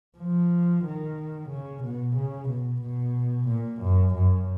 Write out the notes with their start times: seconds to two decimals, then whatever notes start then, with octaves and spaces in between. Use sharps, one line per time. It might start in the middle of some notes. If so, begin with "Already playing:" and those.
0.18 F3
0.85 D#3
1.50 C#3
1.83 B2
2.16 C#3
2.49 B2
2.82 B2
3.48 A#2
3.82 F#2
4.15 F#2